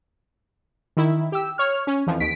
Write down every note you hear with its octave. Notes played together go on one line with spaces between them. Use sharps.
D#3 E4
G4 E6
C#5 F6
C#4
F2 E3 F3
D#2 B6 D7